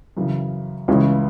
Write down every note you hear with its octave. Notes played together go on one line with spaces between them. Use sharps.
F#2 C#3 E3
C#2 C#3 E3 G#3 C#4